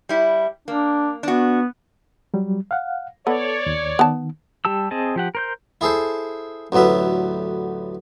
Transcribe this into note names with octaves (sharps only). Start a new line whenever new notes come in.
G3 E4
A#3 D4
B3 D4 F#4
F#3 G3
F5 F#5
B3 A4 C#5 D5
D#2
D#3 B3 A5
G3 G4 A5 E6
C4 G#4 D#5 A5
F3 G4 F#5
A#4 C5 G6
E4 G#4 A4 C5
A1 D2 F#3 B3 E5